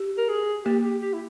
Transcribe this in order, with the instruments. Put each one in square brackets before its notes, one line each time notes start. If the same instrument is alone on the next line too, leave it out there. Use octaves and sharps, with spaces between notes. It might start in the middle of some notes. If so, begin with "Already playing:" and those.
Already playing: [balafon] G4
[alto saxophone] A#4
G#4
[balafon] A#3 [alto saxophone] G4
[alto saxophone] G4
G4
E4